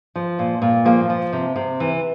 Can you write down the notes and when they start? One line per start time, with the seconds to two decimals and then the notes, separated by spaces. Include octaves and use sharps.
0.15 F3
0.39 A#2
0.62 A#2
0.85 F3 A#3
1.10 F3
1.33 C3
1.56 C3
1.80 E3